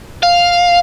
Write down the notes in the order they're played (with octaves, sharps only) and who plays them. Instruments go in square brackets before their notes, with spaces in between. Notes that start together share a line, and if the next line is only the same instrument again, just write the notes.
[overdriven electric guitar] F5